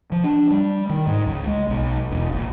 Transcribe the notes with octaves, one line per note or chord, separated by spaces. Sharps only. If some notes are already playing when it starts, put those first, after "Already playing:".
F3
D4
G3
D#3
G#2
C#2
G#3
B1
E1
A#1